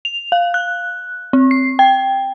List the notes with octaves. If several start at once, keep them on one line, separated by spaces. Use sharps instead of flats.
F7
F5
F#6
C4
C7
G5